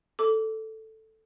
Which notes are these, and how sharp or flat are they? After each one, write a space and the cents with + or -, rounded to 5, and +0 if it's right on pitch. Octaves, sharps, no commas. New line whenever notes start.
A4 +0 D6 -20